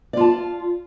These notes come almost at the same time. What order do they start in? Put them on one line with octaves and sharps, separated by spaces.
D5 F4 A5